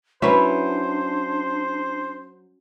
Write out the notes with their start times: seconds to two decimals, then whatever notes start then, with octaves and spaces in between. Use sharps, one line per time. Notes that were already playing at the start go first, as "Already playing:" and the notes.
0.22 F#3 C#4 D4 E4 B4 C5